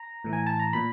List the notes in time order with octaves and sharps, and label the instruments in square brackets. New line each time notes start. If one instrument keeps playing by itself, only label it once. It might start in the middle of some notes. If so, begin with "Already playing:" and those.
Already playing: [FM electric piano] A#5
A2 E3
G#5
A5
A#5
A#2 B5